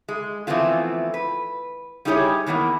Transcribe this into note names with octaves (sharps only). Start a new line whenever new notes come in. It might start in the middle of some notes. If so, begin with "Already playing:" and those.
G#3
E3 F3 A3 B3 C4 F4
B4
G3 D#4 E4 G4 G#4 C#5
D#3 E3 A#3 B3 A#4